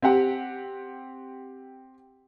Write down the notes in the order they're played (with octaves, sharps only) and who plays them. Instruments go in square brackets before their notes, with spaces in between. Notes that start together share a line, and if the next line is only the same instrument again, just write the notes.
[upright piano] C4 G4 F#5